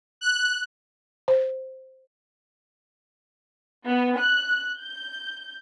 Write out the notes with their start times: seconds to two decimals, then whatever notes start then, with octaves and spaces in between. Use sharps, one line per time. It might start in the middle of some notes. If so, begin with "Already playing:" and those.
0.21 F#6
1.28 C5
3.86 B3
4.19 F#6
4.79 G6